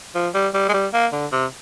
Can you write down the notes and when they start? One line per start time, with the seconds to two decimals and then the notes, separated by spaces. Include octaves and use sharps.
0.15 F3
0.34 G3
0.54 G3
0.69 G#3
0.73 G3
0.93 A#3
1.12 D3
1.32 C3